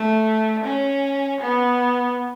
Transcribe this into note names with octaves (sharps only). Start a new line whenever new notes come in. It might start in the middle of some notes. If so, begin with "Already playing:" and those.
Already playing: A3
C#4
B3